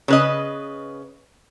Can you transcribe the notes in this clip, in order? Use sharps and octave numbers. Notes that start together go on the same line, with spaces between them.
C#3 B4 D#5